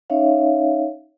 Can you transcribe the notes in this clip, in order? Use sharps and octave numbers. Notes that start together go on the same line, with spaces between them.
C#4 D#4 C#5 E5 F5